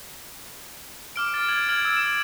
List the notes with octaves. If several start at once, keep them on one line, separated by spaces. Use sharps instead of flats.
D6 F6 D7
F6 A6
G#6 F#7
F6 G#6 D7 F#7
E6
E7